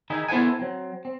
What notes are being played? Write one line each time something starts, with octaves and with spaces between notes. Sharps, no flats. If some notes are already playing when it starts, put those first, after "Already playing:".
D#3 D#4 E4 G#4
B3 E4 A4 C5 F#5 G#5
F#3 C4
C4